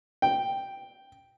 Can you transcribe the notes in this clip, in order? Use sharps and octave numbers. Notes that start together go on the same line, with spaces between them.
G5